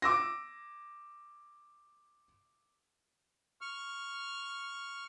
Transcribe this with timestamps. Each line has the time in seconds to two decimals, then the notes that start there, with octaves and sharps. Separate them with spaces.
0.02 D6 E6 A#6
3.61 C#6 F6